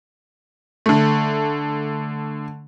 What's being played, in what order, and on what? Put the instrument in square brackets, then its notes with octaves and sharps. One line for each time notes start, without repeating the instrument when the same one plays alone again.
[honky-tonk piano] D3 A3